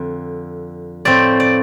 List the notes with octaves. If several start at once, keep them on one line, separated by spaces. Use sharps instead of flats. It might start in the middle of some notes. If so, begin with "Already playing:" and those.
Already playing: F2 D3
A2 F3 A3 C4 D5
D5